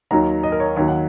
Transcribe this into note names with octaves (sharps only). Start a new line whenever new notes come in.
D#2 D#3 F#3 A#5
D#5
A#4
C#5
D#2 D#3 F#3 C#5
F#5